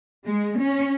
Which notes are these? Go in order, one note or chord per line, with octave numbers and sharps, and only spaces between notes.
G#3
C#4